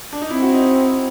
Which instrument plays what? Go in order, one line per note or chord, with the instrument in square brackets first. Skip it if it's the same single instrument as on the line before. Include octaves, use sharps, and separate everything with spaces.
[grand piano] D4
D#4
[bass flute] C4 [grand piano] E4
[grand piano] F#4
D#4